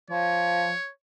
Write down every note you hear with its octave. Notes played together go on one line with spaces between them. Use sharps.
F3 C#5